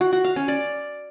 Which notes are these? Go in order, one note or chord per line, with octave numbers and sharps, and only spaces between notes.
F#4
F#4
F5
C#4
D5